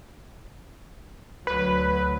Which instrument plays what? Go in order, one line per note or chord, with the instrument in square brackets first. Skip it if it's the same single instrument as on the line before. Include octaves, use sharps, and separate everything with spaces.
[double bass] D2 F#3 [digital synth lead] B4